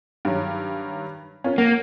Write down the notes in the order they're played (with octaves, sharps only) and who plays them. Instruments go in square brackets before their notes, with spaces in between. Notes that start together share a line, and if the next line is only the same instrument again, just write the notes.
[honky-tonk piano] G2 D#3 F#3
C#4 F4 A#4
[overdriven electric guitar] A#3 [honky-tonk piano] F#5